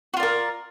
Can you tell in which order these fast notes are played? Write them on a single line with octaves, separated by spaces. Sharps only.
F#4 F4 D5 A#4